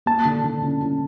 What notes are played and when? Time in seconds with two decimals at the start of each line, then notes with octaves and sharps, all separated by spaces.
0.06 A#3 A5
0.25 D3
0.44 D3
0.63 C#4
0.81 C#4